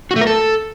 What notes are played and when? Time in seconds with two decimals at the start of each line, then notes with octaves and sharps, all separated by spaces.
0.11 F#4
0.16 A3
0.21 A#4
0.27 A4